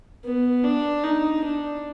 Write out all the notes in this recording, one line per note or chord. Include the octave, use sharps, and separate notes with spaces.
B3
D4
D#4
D4